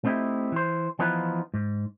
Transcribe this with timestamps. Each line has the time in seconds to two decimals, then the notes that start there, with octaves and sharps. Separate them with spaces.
0.05 A3 C4 D#4 E4 G4
0.52 E3 C5
0.99 E3 F3 B3 D#4 F4 B4
1.54 G#2